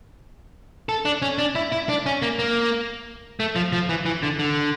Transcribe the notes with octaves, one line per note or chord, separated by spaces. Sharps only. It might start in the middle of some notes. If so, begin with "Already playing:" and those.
A4
D4
C#4
D4
E4
E4
D4
C#4
A#3
A#3
A3
F3
F3
E3
E3
D3
D3